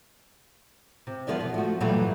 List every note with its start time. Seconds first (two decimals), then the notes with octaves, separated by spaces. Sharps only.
1.07 C3
1.27 F3 B3 G4 A#4 D5 E5
1.40 B2
1.54 F3 A3 F#4
1.80 G2 A#2 E3 F#3 G3 A3